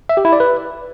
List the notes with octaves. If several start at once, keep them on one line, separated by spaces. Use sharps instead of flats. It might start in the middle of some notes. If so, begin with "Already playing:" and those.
E5
G4
E4
D5
B4